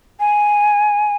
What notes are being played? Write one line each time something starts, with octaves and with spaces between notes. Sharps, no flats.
G#5